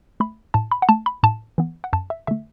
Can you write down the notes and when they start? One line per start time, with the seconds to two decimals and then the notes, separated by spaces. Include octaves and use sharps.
0.20 A3 B5
0.54 A2 A5
0.72 B5
0.82 F#5
0.89 A3 A5
1.06 B5
1.23 A2 A5
1.58 E3 B3
1.84 F#5
1.93 F#2 A5
2.10 E5
2.27 D3 A3 E5